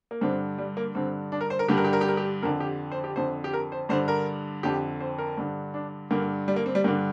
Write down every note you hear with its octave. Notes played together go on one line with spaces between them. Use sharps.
A#3
G2 D3 C4
G3
A#3
G2 D3 C4
D4
A#4
C5
A#4
G2 D3 G4
A#4
G4
A#4
G4
A#4
G4
F2 D3 A#4
G4
C5
G4
F2 D3 C5
G4
A#4
C5
G2 D3 C5
A#4
F2 D3 G4
C5
A#4
G2 D3
D4
G2 D3 A#3
G3
A#3
C4
G3
G2 D3 A#3